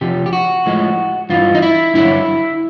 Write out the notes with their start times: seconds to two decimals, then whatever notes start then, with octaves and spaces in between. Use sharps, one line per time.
0.01 F2 C3 F3 G4
0.26 G4
0.33 F#4
0.66 A2 F3 G#3
1.30 G2 E3 F4
1.55 D#4
1.62 E4
1.94 G2 D3 F#3 E4